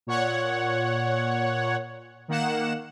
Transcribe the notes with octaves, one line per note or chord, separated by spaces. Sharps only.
A#2 C#5 F#5
D#3 A#3 F#5 E7